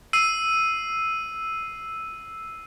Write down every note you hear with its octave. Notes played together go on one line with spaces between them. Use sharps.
E6 C7 D#7